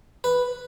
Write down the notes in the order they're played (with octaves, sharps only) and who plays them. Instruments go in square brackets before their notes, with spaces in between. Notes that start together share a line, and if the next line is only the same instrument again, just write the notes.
[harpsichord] B4